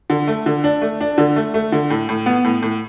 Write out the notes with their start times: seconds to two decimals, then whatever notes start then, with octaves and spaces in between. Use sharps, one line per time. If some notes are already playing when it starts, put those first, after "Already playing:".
0.10 D3
0.27 A3
0.46 D3
0.64 D4
0.82 A3
1.01 D4
1.18 D3
1.36 A3
1.54 A3
1.72 D3
1.90 A2
2.09 A2
2.26 B3
2.44 A2
2.62 A2